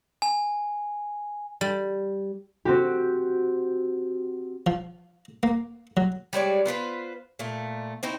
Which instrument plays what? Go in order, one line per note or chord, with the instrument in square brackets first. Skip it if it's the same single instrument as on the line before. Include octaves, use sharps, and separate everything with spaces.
[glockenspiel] G#5
[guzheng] G3
[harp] C4 F#4 G4
[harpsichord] F3
A#3
F#3
[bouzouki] G3 G#3 C#5 D5
B3 F4 B4 C5
A#2 A3
C4 D#4 E4 F#4